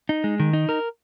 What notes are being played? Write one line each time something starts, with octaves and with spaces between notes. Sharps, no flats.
D#4
G#3
D#3
D#4
A#4